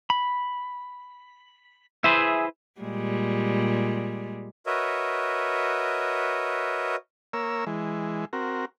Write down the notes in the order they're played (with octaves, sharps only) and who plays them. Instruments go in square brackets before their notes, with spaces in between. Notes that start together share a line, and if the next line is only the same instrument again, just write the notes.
[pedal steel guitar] B5
[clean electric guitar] E4 B4 C5 [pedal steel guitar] G#4 E5
[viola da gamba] A#2 G3 G#3
[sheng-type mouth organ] F#4 A#4 B4 C#5 D#5 E5
[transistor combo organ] A#3 A#4 C#5 E6
E3 G#3
C4 F#4 A#4